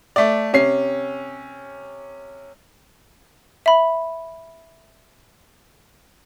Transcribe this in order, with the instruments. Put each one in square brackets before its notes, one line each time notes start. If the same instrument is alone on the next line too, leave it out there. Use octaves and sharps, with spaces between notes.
[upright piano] A3 D5
C3 C#4 C7
[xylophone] E5 B5